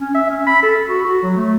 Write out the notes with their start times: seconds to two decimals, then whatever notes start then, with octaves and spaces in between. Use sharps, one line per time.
0.01 C#4
0.14 E5
0.30 C#4
0.47 B5
0.62 A4
0.89 F#4
1.05 F#4
1.22 F#3
1.36 A3